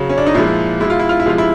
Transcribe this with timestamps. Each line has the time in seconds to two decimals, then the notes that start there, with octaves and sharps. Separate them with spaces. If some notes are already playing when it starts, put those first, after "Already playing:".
Already playing: C#3 F#3
0.09 C#4
0.18 D4
0.27 D#4
0.34 A#2 F3 G#3 E4
0.80 B2 G#3 E4
0.90 F4
0.99 E4
1.09 F4
1.20 E4
1.26 C3 F3 G#3 F4
1.38 E4